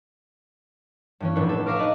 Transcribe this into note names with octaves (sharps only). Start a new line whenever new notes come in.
G2 E3 C#4
F1 A#1 A2 D4 B4 C#5
A4
E5 F5 A#5 C#6 D6 F6
D4 D#4 B4 D#5 A5 B5